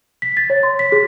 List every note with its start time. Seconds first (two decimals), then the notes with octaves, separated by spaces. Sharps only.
0.22 B6
0.37 A6
0.50 C#5
0.63 C6
0.79 B6
0.92 G#4